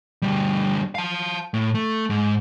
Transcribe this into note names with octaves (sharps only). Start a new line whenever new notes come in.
D2 G3
F5 A5
A2
A3
G#2